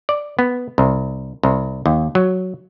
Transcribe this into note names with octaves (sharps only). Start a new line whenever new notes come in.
D5
B3
C2
C2
D#2
F#3